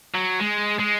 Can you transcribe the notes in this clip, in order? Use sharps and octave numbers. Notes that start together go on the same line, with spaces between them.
F#3
G#3
G#3